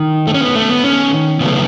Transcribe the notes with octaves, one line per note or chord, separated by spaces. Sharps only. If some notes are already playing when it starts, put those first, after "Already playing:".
Already playing: D#3
A3
C#4
B3
A3
B3
C#4
C#3 F#3 A3 B3